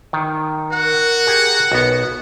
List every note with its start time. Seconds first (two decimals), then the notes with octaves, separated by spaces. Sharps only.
0.13 D#3
0.72 F#4 A#4 F#5
1.27 G4 G#4
1.72 B1 B3